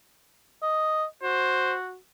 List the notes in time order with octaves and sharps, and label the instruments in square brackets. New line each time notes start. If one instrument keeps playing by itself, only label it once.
[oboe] D#5
[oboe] F#4 [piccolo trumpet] C5